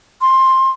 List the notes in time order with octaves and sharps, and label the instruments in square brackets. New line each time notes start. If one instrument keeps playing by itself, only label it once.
[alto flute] C6